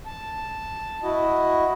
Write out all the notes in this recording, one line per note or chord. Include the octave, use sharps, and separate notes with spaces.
A5
E4 F#4 D#5